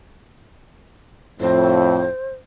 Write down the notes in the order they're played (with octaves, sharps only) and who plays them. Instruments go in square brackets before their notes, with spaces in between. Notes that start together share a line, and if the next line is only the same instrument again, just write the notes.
[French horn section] F2 A2 [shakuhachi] C5